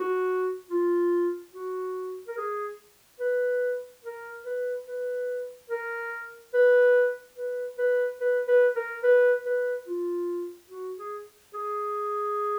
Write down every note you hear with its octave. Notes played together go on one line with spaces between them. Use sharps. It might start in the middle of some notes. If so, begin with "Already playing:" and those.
Already playing: F#4
F4
F#4
A#4
G#4
B4
A#4
B4
B4
A#4
B4
B4
B4
B4
B4
A#4
B4
B4
F4
F#4
G#4
G#4